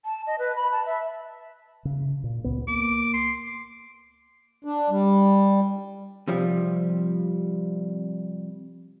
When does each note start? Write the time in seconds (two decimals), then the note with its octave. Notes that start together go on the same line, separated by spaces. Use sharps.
0.05 A5
0.27 D#5
0.39 B4
0.56 B5
0.72 A5
0.86 E5
1.85 C#3
2.24 A#2
2.44 C#2 B3
2.68 A#3 D6
3.14 C6
4.65 D4
4.90 G3
6.28 C3 F3 G3